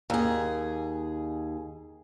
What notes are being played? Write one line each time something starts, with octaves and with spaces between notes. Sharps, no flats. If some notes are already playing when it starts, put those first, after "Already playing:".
D#2 G#4